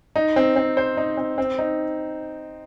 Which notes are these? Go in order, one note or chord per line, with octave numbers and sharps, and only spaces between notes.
D#4
C4
C4
C5
D#4
C4
C4
D#4